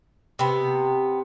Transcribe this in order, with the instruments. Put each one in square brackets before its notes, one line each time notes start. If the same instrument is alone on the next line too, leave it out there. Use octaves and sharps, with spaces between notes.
[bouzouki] C3 B3